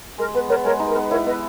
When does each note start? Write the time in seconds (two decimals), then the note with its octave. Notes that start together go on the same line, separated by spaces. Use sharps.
0.18 G#3 A#4
0.34 B3 B4
0.49 B3 A#4 C#5
0.64 G#3 A#4 C#5
0.79 D#4
0.88 A#4
0.95 B3
1.11 E4 A#4 C#5
1.26 B3 B4 D#5